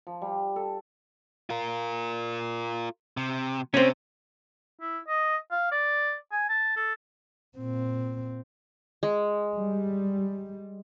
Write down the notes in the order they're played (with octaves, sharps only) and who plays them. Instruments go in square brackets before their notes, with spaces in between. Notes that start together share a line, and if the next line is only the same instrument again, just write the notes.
[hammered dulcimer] F3
G3
A4
[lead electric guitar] F4 A#4
C3
[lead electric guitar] C3 [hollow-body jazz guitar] C4 C#4
[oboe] E4
D#5
F5
D5
G#5
A5
A4
[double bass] A#2 C4
[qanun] G#3
[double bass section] G3